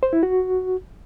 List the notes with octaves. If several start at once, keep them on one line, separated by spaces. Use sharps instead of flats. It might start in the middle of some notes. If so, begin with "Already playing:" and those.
C5
E4
F#4